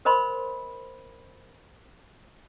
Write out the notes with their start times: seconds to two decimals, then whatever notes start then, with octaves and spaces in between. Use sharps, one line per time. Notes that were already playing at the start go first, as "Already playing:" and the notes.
0.05 A#4 C5 D#5 B5 C6